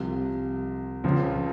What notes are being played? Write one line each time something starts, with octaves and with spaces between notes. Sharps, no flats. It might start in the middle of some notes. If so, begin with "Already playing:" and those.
Already playing: C2 C3 F3
C#2 C#3 F3